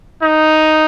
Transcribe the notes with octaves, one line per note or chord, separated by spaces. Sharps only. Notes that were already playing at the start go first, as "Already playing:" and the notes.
D#4